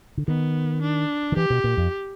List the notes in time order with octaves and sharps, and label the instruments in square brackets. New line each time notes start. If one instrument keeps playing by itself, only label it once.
[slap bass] D3
[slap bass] D#3 [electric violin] B3
[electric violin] D4
[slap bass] D#3
[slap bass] E3 [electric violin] G4
[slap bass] B2
A#2
F2